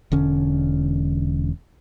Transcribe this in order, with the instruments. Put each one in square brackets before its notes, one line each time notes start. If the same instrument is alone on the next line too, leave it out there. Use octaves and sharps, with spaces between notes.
[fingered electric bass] E1 D3 C#4